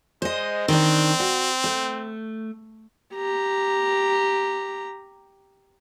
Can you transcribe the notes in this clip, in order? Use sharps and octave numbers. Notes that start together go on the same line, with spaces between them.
G#3 C5 D#5
D#3 C4 D4
F#4
A3
G4 A#5